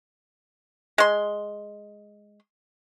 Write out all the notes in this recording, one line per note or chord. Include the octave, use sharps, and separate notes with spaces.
G#3 C6